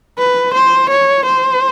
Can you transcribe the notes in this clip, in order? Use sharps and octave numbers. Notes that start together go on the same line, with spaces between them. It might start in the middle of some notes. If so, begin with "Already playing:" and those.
B4
C5
C#5
C5